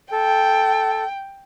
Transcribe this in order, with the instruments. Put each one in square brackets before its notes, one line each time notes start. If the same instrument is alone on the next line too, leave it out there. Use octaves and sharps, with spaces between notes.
[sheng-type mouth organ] A4 [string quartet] G5